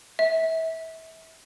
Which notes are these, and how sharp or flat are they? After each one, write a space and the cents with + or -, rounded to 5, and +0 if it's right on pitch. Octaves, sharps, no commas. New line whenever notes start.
E5 -30